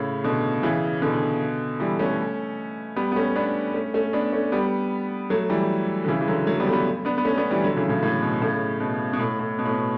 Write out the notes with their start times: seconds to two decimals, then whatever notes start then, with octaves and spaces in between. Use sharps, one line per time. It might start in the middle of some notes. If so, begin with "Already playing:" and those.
Already playing: A2 C#3
0.24 B2 D3
0.63 C#3 E3
1.02 B2 D3
1.80 E3 G3
1.99 A3 C#4
2.96 G3 B3
3.12 B3
3.16 A3 C#4
3.36 B3 D4
3.74 A3 C#4
3.94 A3 C#4
4.13 B3 D4
4.33 A3 C#4
4.52 G3 B3
5.30 F#3 A3
5.50 E3 G3
6.04 D3
6.08 C#3 E3
6.21 E3
6.28 D3 F#3
6.47 F#3 A3
6.60 G3 B3
6.66 A3
6.73 G3 B3
7.05 B3 D4
7.18 B3
7.25 A3 C#4
7.37 B3 D4
7.51 E3 G3
7.64 D3 F#3
7.77 C#3 E3
7.89 A2 C#3
8.03 A2
8.22 B2
8.42 A2 C#3
8.80 B2
9.13 B2
9.19 A2
9.39 A2
9.59 B2
9.65 A2
9.72 B2